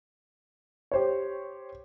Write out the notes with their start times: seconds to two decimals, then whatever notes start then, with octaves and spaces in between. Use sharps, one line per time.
0.92 G4 C5 C#5